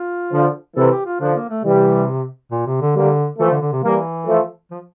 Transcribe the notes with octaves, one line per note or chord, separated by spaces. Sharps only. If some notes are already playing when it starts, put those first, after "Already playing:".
Already playing: F4
D3 F3
C3 E3 A4
G4
F4
D3 F3 D4
A#3
A3
C3 E3 G3
A#2
C3
D3
D3 G3 A#3
E3 F3 A3
D3
D3
C3
E3 G3 A#3
F3 A3
F3